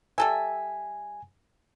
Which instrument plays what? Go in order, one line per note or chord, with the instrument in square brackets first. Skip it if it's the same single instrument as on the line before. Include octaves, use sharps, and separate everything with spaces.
[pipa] G3 A4 E5 [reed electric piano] G#5